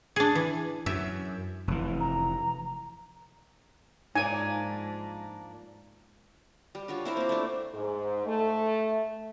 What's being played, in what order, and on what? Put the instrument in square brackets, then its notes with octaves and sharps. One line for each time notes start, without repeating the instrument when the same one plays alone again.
[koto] D4 G#4
E3
[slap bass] F#2 [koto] E5
[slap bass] F1 E3
[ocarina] A#5
[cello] G#2 [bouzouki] F3 A#3 D4 [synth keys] D#4 [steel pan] G#5
[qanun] G3
D4 F4 F#4 C#5
C4 E4 A#4 C5
A#3 E4
A3 D4
[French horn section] G#2
A3